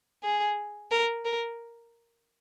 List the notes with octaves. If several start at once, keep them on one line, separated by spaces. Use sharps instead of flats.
G#4
A#4
A#4